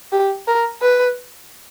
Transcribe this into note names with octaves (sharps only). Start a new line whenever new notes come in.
G4
A#4
B4